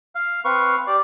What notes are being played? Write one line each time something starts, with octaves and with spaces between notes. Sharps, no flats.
F5
C4 B4 F5 C#6
G4 D5